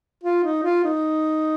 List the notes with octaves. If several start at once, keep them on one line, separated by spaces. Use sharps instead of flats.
F4
D#4
F4
D#4